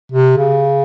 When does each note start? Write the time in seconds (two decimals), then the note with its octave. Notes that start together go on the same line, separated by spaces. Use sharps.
0.12 C3
0.37 C#3